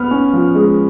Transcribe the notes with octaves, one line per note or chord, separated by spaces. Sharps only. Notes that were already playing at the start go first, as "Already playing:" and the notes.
Already playing: B3 F6
C#4
F3
G#3